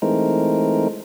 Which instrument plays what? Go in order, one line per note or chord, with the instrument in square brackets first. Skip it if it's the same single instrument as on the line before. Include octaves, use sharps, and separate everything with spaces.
[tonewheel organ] E3 G#3 A3 C4 D#4 A#4